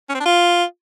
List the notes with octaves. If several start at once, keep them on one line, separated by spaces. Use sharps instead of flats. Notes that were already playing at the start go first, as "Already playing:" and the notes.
C#4
C4
D4
F4